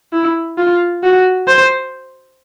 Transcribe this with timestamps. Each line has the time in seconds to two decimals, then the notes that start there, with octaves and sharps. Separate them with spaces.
0.13 E4
0.58 F4
1.03 F#4
1.48 C5